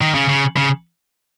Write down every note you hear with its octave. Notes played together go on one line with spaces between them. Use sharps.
D#3
C#3
C#3
C#3